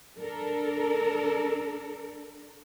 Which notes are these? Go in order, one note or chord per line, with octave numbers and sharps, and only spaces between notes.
D4 A4 A#4